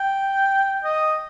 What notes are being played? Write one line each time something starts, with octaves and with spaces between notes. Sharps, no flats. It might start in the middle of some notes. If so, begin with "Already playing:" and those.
Already playing: G5
D#5